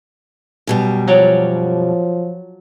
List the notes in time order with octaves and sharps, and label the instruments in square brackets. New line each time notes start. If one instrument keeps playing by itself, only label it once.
[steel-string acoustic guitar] F#2 B2 G3
[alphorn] F3 [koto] F#3 C#5 D5